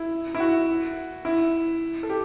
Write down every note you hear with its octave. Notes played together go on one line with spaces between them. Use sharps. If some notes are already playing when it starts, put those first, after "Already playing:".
Already playing: E4
E4
F#4
E4
A4
G4